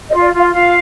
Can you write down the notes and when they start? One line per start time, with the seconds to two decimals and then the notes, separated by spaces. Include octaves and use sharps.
0.09 D#5
0.12 F4
0.22 D5
0.33 F4 F5
0.53 F4 F5